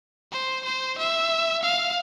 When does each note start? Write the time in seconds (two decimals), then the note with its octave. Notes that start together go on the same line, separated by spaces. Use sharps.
0.32 C5
0.65 C5
0.98 E5
1.63 F5